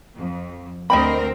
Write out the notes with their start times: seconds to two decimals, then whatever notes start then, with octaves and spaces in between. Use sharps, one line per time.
0.15 F2
0.90 D2 C4 A#4 D#5 G5 B5